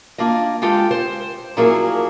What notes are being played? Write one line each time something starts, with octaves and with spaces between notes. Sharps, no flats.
A#3 D4 F4 D#5
G#3 F4 G4 A4
C5
A#2 F3 F#3 A#3 E4 G#4